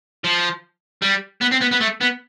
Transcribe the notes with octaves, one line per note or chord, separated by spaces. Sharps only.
F3
G3
B3
C4
B3
B3
A3
B3